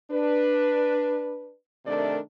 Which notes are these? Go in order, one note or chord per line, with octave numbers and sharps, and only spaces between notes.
D4 B4
C3 D#3 A3 D4 A#4 D5